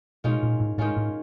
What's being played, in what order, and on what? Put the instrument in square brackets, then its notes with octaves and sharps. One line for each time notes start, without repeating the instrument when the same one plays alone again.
[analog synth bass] B2 [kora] D#3 G#3 C#4 F4
[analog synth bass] A#2
A2
[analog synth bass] A2 [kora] D#3 G#3 C#4 F4
[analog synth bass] A2